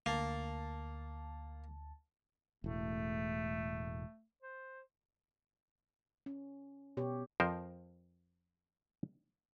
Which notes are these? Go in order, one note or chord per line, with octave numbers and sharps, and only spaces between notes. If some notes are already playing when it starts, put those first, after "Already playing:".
D2 A#3 A5
E1 A2 A3
C5
C#4
B2 G4 C#5
F2 F3 A#4 C5